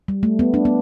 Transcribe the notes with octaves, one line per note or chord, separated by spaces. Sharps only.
G3
A3
B3
D4
B3